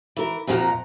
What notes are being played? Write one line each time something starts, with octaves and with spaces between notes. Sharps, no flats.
E3 A#4
F2 A#2 F3 G4 F#5 A#5